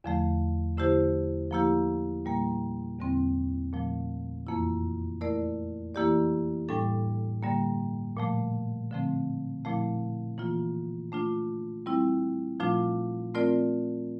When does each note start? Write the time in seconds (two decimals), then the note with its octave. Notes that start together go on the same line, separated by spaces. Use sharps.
0.04 E2 D3 F3 A3
0.78 D3 A3 E4 G4 C5
1.51 F3 A#3 E4 G4
2.25 A#2 G3 A#3
2.99 E2 D3 G3 C4
3.73 A#2 F3 A3
4.47 F2 E3 A#3 E4
5.21 A3 E4 A#4 D5
5.95 E3 A#3 E4 G4 D5
6.69 A2 G3 D4 A4
7.43 G2 D3 G3 A#3
8.17 A#2 F3 A3
8.91 D3 F3 A3 C4
9.65 A#2 F3 A3 E4
10.38 E3 A#3 F4
11.12 A3 D4 F4
11.86 G3 C4 E4
12.60 A#2 F3 A3 D4 F4
13.35 A3 C4 F4 A#4 D5